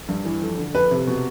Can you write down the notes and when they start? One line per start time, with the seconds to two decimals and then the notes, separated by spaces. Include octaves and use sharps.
0.09 G2
0.25 E3
0.41 F2
0.58 D3
0.75 F2 B4
0.91 C3
1.07 B2